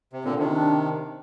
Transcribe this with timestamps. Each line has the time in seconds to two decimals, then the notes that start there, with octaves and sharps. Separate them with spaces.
0.13 C3
0.24 A#2 D3 C4
0.39 C3 D#3 D4
0.49 C4
0.53 D4